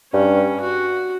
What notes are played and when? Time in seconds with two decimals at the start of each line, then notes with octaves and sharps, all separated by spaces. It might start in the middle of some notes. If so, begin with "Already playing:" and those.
0.13 G2 C#4
0.61 F#4